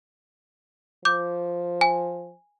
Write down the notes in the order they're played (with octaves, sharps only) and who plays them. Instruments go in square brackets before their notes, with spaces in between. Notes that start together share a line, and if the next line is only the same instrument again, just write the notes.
[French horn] F3 [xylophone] D6 G6
[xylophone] G#5